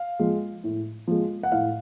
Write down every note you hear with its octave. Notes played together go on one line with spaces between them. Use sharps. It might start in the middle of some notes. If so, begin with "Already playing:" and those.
Already playing: F5
F3 G#3
A2
F3 G#3
F#5
A2 F5